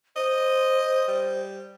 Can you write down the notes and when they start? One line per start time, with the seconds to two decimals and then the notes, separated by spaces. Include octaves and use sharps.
0.16 C5 D#5
1.08 G3